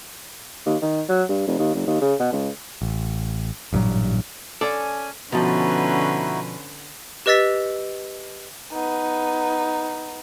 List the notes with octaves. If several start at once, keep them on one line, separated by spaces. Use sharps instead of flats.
D#2
D#3
F#3
G2
F1
D#2
F#1
D#2
C#3
B2
C#2
A1
A1 G2 A#2 F#3
C#4 A4 D5 G#5
B2 D3 F3 C#4 D#4 E4 F#4 B4
G4 B4 D#5 E6 A6 B6
B3 D#4